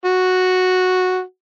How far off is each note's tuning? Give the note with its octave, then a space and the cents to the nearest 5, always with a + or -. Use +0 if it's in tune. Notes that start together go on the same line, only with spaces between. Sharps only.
F#4 -5